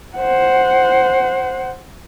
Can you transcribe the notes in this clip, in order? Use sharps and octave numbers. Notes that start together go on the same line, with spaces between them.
C5 F#5